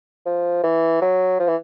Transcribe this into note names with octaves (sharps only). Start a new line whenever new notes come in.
F3
E3
F#3
F3
E3